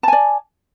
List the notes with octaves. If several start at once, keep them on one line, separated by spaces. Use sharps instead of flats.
D5 G#5 A5